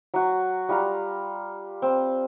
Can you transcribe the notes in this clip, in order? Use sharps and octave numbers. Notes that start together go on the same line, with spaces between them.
F#3 F#4
G3 F4 A#5
C4